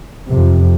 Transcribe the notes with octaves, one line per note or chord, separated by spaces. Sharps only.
F2 C3